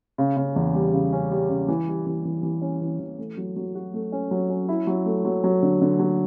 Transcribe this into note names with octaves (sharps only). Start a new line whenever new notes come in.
C#3
C#3
E2
G3
C#3
C#4
G3
C#3
E3
G3
E3
E3
E3
C#4
E3
E3
A3
F#3
F#3
F#4
A3
C#4
F#3
C#4
E4
F#3
A3
F#3
F#3
D3
D3
F#3